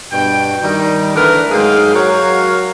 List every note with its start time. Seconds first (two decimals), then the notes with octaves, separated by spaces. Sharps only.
0.12 G2 B2 G5
0.63 D#3 G3 D#4
1.15 D3 E3 A3 A#4 B4
1.51 G#2 F#3 G#3 G#4 F5 G5
1.94 F#3 F#4 A#4 C#5 F5